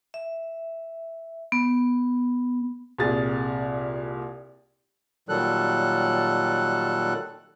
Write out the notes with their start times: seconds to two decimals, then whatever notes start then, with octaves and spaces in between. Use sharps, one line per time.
0.14 E5
1.52 B3
2.98 C2 A#2 G#4 A6
5.29 A#2 D#3 F#3 G3 A4 F#6